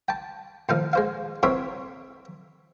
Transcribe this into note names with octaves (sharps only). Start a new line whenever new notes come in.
G5 A5
A2 D#3 F3 D#4 F5
G#3 C5 F5
E3 C4 A#4 C5 C#5 E5